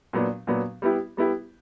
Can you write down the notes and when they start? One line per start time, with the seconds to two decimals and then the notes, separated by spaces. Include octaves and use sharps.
0.13 A#2 F#3 B3 D4
0.47 A#2 F#3 B3 D4
0.82 G3 B3 E4 G4
1.17 G3 B3 E4 G4